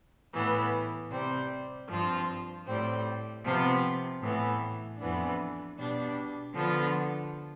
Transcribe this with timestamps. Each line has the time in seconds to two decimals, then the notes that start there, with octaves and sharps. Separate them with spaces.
0.33 A2 E3 B3
1.10 C3 G3 C4
1.88 G2 F3 C4 F4
2.67 A2 G3 C4
3.44 C3 F3 B3 F4
4.21 A2 E3 B3
4.98 F2 E3 B3 D4
5.77 B2 G3 D4
6.54 D3 F3 B3 F4